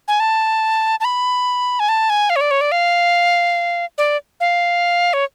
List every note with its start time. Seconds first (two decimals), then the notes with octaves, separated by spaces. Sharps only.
0.08 G#5
0.20 A5
1.00 A5
1.05 B5
1.80 G#5
1.89 A5
2.10 G#5
2.30 F5
2.36 C#5
2.41 D5
2.51 C#5
2.61 D5
2.72 F5
3.98 D5
4.40 F5
5.13 C#5